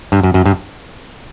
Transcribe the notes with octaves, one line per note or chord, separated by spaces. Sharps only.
G2
F#2
F#2
G2